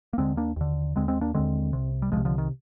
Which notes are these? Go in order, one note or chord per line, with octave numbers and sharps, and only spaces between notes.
A#3
D#2 D3 G#3 C4
A#3 D4
D#2 D3
D#2 D3 G#3 C4
G#3 C4
A#3 D4
D#2 D3 G#3 C4
C2 C3
G3
C2 C3 F3 G#3
D3 F3
D#3